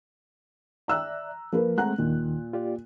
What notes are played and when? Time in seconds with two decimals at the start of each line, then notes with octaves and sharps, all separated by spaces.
0.88 D5 E5 A#5 E6 F#6
1.53 F3 A#3 A#4 B4
1.78 G#3 A3 C4 F#5 A#5 F#6
1.98 D#2 A#2 D#3
2.53 F4 G4 D5